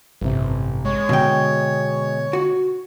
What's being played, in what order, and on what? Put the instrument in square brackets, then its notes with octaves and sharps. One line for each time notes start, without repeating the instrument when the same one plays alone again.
[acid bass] A1 [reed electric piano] G2 C3
[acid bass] G#3 [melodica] C#5
[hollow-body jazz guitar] B2 G5 [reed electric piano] D3
[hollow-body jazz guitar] F#4